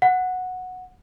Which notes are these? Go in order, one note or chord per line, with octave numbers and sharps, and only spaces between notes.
F#5